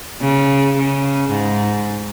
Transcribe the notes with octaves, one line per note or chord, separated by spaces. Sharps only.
C#3
C#3
G#2